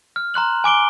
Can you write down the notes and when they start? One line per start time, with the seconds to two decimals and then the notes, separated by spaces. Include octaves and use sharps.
0.16 F6
0.34 A#5 C6 F#6 F#7
0.64 G#5 D6 D7 G7